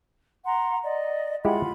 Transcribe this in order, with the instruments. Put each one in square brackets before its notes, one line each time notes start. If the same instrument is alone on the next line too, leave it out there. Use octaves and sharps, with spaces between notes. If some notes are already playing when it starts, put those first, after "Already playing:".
[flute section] F#5 A#5 C6
D5 D#5
[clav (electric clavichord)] G#3 E4 G4 [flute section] F4 F#5 B5